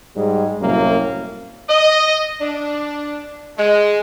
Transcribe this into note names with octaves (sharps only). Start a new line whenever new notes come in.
G#2 G3 G#3
C2 F#2 A2 A#3
D#5
D4
G#3